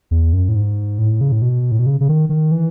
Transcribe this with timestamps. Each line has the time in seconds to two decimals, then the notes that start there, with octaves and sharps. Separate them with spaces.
0.11 E2
0.33 F#2
0.49 A2
0.55 G#2
0.98 A2
1.21 C#3
1.32 A2
1.42 B2
1.71 A2
1.79 B2
1.86 C#3
2.01 C#3
2.09 D#3
2.29 D#3
2.52 E3